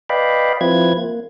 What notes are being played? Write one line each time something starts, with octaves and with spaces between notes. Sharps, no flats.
B4 D5 D#5 F5 G5 B5
F3 C4 E4 F4 B4 G#6
A#3